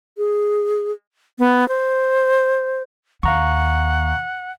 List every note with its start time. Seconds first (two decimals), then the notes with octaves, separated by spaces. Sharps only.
0.18 G#4
1.39 B3
1.68 C5
3.23 D#2 F5 F#5 A#5 C#6